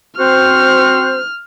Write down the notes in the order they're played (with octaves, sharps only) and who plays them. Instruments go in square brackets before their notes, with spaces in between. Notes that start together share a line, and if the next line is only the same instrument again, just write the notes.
[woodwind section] C4 F#4 C5 [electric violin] F6